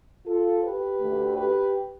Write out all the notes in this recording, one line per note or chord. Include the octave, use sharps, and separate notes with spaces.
F4 A4
G4 B4
D2 D3 A3
G4 B4